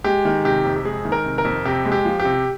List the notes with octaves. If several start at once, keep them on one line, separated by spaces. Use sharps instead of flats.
G#3 G4
D#3
C3 G4
F2
G4
G#3 G#4
D#3
A#4
C3
A#4
F2
C3 G4
G#3
G4
F3
G4
C3